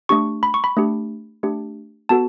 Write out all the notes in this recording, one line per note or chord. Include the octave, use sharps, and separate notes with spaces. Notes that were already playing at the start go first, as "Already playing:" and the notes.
A3 D4 G4 C#6
B5
C#6
B5
A3 D4 G4
A3 D4 G4
B3 F#4 A4 A5